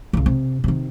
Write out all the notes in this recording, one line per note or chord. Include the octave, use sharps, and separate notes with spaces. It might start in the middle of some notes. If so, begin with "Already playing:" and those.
C2 C#3
C3
C3 D#3